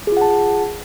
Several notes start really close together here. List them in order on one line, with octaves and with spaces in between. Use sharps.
G#4 F4 F#5 A5